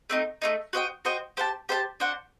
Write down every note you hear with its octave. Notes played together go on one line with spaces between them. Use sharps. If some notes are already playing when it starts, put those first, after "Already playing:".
A3 C4 D#4
A3 C4 D#4
F#4 C5 D#5 G5
F#4 C5 D#5 G5
G4 C5 F#5 A5
G4 C5 F#5 A5
D4 F#4 C5 F#5